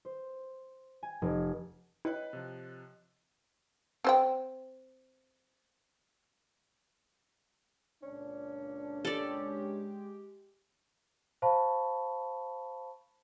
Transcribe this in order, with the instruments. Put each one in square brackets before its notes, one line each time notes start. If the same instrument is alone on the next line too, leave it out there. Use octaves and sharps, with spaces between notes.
[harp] C5
G#5
F1
[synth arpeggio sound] E4 [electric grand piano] B4 F#6 [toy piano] C#5 D#5 G5
[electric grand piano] C3 F3
[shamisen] C4 C5 G5
[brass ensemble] C#2 A#2 D4 [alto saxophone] C#4
[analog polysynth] G#3 G4 [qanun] A4 D5
[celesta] C5 F5 A5 B5 C#6